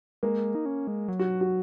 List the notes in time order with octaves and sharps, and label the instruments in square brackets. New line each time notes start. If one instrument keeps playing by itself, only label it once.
[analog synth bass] G#3 [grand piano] A#3
[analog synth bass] D#4
C#4
G#3
F#3
[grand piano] F#4
F#4